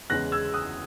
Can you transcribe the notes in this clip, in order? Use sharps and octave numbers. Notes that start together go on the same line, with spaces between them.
E2 C#3 G#3 C#4 F#6 A#6
E6 G#6
D#6 F#6